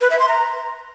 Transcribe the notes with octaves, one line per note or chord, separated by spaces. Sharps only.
B4
E5
C6
A#5